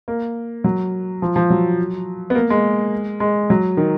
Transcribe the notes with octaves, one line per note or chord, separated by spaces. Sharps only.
A#3
F#3
F3
F3
F#3
B3
A#3
G#3
G#3
F#3
D#3